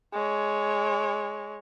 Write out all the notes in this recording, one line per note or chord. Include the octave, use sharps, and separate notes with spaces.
G#3 C#5